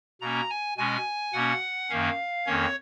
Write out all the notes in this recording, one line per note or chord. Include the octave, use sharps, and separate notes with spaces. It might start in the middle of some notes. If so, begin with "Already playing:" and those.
B2 A#3 C#4 A#5
G#5
B2 G#3 C#4 G#5
B2 A#3 C#4 F#5
F#2 D#3 A#3 C#4 F5
F2 D#3 A#3 C#4 C#5